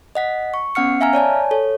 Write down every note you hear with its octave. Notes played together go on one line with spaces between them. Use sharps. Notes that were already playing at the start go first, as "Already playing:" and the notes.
D#5 F#5 B6
C#6
B3 C#4 F#5 F6 C#7
E5 F5 G#5 A#5 F6
C#5 D5 G#5 A5
A4 C#5